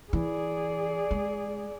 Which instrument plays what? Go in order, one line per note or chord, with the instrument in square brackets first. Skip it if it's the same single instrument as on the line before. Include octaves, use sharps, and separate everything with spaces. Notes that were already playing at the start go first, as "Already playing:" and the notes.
[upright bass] E3 [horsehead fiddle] G#4 D5
[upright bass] G#3